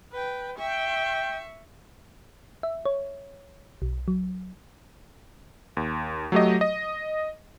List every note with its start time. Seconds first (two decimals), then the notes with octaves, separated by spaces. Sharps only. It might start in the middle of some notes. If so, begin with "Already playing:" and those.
0.12 B4 G5
0.59 E5 G5 C#6
2.63 E5
2.86 C#5
3.82 B1
4.08 F#3
5.77 D#2
6.32 F#3 A3 G4 D#5
6.61 D#5